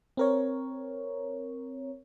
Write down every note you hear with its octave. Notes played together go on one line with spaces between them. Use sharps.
C4 A#4 C#5